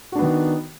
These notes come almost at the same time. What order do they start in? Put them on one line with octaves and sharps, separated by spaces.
F#4 D4 B3 D#3 D#4